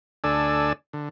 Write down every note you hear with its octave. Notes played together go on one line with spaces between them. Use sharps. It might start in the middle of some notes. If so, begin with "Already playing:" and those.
D2 D4 A4 D5 G#5 E6
D3